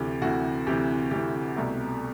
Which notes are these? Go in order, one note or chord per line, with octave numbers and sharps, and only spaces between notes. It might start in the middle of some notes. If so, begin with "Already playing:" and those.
Already playing: D2 C3 E3 G4
D2 C3 E3 F#4
D2 C3 E3 G4
D2 C3 E3 G4
C2 B2 A3